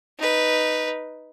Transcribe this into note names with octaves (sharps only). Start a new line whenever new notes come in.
D#4 B4